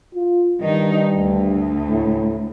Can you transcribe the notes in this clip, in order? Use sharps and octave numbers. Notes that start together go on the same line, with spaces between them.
F4
G2 D#3 D#4
D2
A2